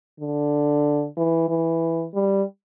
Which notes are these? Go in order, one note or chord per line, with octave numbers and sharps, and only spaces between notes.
D3
E3
E3
G3